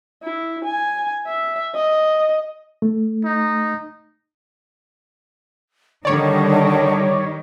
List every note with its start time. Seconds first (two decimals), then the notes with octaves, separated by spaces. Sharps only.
0.24 E4
0.65 G#5
1.27 E5
1.75 D#5
2.82 A3
3.24 D#4
6.05 D3 D#3 G3 D#4 C#5 D5